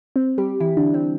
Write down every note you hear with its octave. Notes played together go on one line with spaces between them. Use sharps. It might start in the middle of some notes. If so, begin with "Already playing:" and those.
C4
G3 G4
E3 E4
D3 D4
C4